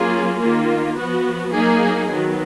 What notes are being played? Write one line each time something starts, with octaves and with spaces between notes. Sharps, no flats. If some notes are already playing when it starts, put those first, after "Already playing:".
Already playing: F#3 A#3 C#4 F4 G#4
D#3 A#3 F4
F3 B3 F#4
F#3 A#3 D#4 G#4
D#3 F#3 B3